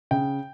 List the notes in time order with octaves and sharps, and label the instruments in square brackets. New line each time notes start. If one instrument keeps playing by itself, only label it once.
[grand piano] C#3 G5